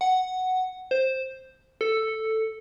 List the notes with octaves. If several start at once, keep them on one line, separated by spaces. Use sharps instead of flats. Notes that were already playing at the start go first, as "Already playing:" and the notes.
F#5
C5
A4